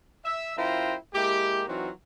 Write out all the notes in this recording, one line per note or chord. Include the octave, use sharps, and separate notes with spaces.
E5
F#2 E4 F4 C5 G5 A#5
G#3 A#3 E4 G4
E3 F#3 C4 D#4 F4 F#4